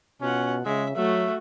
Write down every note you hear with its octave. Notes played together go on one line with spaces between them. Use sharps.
B2 C#4 F4 F#5
C#3 G#3 E5
F#3 A3 F#4 E5